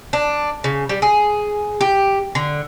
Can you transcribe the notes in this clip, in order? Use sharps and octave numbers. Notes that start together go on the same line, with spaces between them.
D4
C#3
G3
G#4
G4
D3